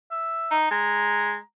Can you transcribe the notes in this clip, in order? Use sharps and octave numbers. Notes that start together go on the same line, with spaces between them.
E5
D#4
G#3 A#5